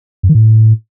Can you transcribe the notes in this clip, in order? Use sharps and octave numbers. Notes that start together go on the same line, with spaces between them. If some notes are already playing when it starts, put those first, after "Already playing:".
F#2
D#3
A2